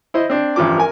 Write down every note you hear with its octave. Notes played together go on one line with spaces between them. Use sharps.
E4 C5 D#5
C4 D4
A1 G2 F3 D6
A#4 G#5